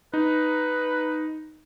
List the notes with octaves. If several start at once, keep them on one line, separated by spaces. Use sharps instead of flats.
D#4 B4